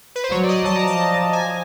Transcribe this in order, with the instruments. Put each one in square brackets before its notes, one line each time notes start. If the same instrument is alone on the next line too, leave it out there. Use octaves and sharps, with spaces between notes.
[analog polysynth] B4
C5
[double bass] F#3 [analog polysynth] C#5
[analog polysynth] D5
D#5
A5
A#5
[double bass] F3 [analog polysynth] A5
[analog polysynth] G#5